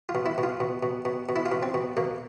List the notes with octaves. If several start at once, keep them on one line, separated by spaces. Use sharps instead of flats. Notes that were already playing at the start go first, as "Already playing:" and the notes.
F4
B2
E4
B2
F4
B2
B2
B2
B2
E4
F4
B2
C4
B2
B2 A#3